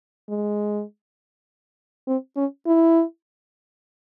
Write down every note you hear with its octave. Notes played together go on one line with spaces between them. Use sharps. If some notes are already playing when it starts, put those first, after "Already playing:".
G#3
C4
C#4
E4